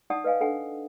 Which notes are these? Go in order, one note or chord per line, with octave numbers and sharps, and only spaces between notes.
D#4 D5 F#5 A5 D#6
B4 D#5 F5 G#5
D4 A4 F#5 G#5